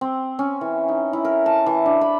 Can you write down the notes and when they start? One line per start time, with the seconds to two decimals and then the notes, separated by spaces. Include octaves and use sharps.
0.01 C4
0.39 C#4
0.61 E3
0.88 D#4
1.13 E4
1.25 A#4
1.46 A5
1.66 E3
1.86 D4
2.01 B5